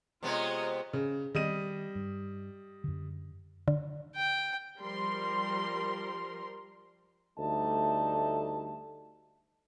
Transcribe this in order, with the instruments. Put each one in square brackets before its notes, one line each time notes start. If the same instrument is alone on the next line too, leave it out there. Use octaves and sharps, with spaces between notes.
[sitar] C3 G#3 B3 [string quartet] F4 C#5 D#5
[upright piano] C#3
[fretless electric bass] D#3 C4 [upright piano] G3 D#5 D#7
[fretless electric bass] G2
F#2 D3
[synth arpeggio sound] D3
[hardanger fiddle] G5
[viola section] F3 G3 A#4 C6
[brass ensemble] D2 G3 A3 D#4 A5